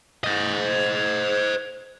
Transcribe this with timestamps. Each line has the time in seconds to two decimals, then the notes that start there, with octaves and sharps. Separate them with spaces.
0.24 C5 D#5